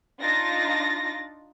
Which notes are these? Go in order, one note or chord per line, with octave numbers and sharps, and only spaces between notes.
D4 D#4 F4 A6 A#6